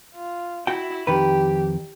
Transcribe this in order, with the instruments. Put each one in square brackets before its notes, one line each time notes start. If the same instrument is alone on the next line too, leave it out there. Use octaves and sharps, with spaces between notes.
[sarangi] F4
[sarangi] E4 [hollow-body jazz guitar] F#4 G5
[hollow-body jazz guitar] F2 D#3 B4 [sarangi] G4